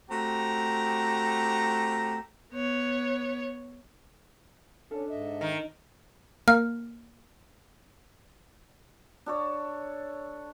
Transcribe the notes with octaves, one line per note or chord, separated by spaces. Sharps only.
A3 C4 F#4 G4 A#5
B3 C#5
C#4 D4 A4
G#2 D#5 E5
D#3
A#3 F6
D4 A4 C#5